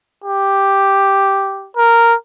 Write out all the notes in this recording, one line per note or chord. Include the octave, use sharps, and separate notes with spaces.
G4
A#4